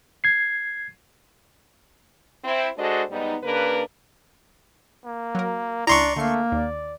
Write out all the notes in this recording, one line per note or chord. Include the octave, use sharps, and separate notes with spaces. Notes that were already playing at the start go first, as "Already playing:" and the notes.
G#6 C7
C4 E4 C5
G#3 D4 F#4 A4 C5 D#5
G#2 G3 B3 D#4
C#3 A#3 D4 A#4 B4
A#3
F#3 A#4
C#2 D4 E4 D5 A#5 C6 C#6
D3 A3 A#3 C7
D#2 D5